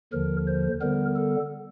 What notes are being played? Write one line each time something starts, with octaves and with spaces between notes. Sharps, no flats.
D#2 D3 F3 A#4
C5
D3 G3 B3 A#4
A4